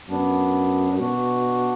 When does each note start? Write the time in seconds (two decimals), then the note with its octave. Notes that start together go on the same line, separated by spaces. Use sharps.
0.09 F#2 B3 D4
1.00 B2 D4 F#4